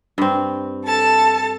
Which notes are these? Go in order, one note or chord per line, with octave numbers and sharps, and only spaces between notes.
G2 C4
A4 A5